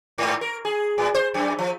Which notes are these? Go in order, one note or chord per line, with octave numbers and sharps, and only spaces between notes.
G#2
A#4
G#4
A2
C5
F#2
F3